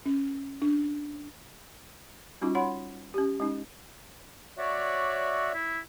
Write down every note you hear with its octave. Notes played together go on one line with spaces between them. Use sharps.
C#4
D4
G3 C#4 D#4 F4 F#4
C#5 F#5 B5 C6
C#4 G4
G#3 C#4 D#4
F#4 C#5 D5 E5
E4